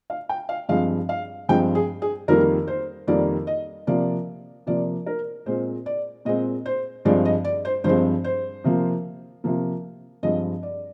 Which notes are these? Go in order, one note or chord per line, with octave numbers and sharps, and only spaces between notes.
F5
G5
F5
G2 F3 G#3 C4 F5
F5
G2 F3 G#3 C4 G5
G#4
G#4
F2 D#3 G3 A#3 A#4
C5
F2 D#3 G3 A#3 D5
D#5
C3 F3 A#3 D5
C3 F3 A#3 D5
A#4
A#2 G#3 C4 C5
D5
A#2 G#3 C4 D#5
C5
G2 F3 G#3 C4 D5
D#5
D5
C5
G2 F3 G#3 C4 C5
C5
C3 F3 A#3
C3 F3 A#3
G2 F3 G#3 C4 D#5
D5